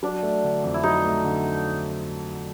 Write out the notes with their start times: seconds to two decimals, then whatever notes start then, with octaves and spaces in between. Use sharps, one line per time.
0.03 F#3 D4
0.23 A3
0.44 D3
0.64 F2
0.74 E4
0.83 F#3 D#4
1.05 A3
1.25 D3